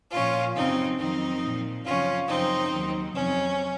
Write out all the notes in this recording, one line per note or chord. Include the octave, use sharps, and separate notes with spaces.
A#2 F3 C#4 F4
F#2 C#3 F#3 C4 D#4
F2 D#3 F#3 C4 D#4
A#2 F3
F#2 C#3 F3 C#4 F4
F#2 C#3 F3 C4 D#4
D#2 D#3 F#3
F2 C3 F#3 C#4